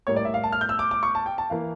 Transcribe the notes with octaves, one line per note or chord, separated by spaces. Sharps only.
A2 G3 A#3 C#5
D5
E5
F5
A5
F6
G6
E6
D6
D6
C#6
A5
G5
A5
E3 A#3 F5